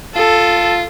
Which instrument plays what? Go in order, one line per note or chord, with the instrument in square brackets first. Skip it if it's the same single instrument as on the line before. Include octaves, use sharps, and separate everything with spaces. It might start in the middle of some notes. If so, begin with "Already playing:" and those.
[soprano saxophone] F4 [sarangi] A4